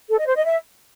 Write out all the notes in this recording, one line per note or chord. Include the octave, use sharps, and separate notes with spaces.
A4
D#5
C5
D#5
E5